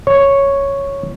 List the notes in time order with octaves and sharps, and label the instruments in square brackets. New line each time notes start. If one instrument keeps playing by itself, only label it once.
[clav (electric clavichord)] C#5